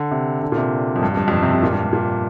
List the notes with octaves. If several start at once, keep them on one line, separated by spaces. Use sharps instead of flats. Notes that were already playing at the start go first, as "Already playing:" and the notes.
Already playing: D3
C3
D3
A#2
C3
F2
G2
F2
G2
F2
G2
C3
C3
A#2
G2
G2
A#2